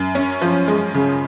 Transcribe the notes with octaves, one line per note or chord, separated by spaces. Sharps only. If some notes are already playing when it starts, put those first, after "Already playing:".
Already playing: F#2
C#4
F3
G#3
C#3